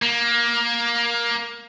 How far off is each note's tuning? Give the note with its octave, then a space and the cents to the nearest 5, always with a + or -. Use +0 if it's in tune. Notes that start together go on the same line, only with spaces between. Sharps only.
A#3 +15